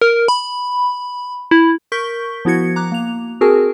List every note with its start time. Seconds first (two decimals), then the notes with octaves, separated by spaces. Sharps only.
0.02 A#4
0.28 B5
1.51 E4
1.92 A#4 C#6 G6 B6 G7
2.45 F3 B3 E4 F#4 G#6 C#7
2.76 A#5 D6 F#6
2.92 A#3 F7
3.41 C4 F#4 G#4 A#4 G#5 A5